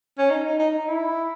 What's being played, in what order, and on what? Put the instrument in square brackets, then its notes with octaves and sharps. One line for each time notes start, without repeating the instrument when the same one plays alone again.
[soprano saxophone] C#4
D#4
D#4
D#4
D#4
E4